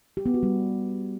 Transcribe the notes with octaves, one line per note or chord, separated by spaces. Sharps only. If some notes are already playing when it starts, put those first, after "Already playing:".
G4
B3
F#4
G3